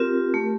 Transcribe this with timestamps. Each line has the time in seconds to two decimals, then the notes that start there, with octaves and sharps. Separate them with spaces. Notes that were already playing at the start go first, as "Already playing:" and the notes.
Already playing: C4 F4 G4 A#4
0.34 A3